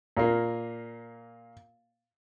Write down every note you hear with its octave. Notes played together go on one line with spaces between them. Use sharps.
A#2 A#3